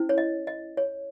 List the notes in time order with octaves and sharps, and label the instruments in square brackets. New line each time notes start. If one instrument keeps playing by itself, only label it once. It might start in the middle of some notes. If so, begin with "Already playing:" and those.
Already playing: [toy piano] C#4 E4 C5
C#5
D#5
D#5
C#5